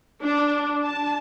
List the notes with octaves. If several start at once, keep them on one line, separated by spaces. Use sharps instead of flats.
D4
A5